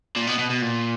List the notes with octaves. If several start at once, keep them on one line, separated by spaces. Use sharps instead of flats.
A#2
B2
B2
B2
A#2